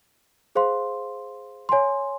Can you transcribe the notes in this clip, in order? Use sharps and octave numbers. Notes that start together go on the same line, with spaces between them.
G#4 C5 F5 C6
C#5 G#5 C6